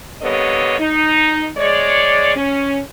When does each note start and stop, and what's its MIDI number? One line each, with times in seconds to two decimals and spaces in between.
0.22 0.75 50
0.22 0.75 55
0.22 0.75 58
0.22 0.75 59
0.22 0.75 73
0.22 0.75 75
0.79 1.48 63
1.57 2.33 56
1.57 2.33 73
1.57 2.33 74
2.36 2.79 61